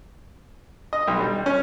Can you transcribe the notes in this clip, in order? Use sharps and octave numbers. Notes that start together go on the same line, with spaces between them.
D#5
B1
G3
C#4